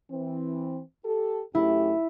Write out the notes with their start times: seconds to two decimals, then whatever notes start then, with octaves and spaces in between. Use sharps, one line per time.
0.11 E3 C4
1.05 G4 A4
1.55 F#2 A3 E4 G4